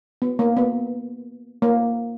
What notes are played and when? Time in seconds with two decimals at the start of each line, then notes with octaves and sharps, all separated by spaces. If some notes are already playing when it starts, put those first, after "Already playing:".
0.22 B3
0.39 A#3
0.57 B3
1.62 A#3